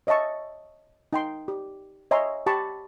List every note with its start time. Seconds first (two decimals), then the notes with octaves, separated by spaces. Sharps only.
0.07 C#5 D#5 E5 A5 C#6
1.13 D#4 G5 C6
1.48 G4
2.11 C#5 D#5 E5 G#5 A#5 C6
2.46 G4 A5 B5 C#6